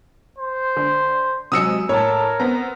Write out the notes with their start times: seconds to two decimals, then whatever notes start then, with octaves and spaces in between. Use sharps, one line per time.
0.38 C5
0.77 D3
1.52 C3 F#3 G#3 D#6 E6 C#7
1.89 A2 A#4 C#5 A5
2.40 B3 C4 A#5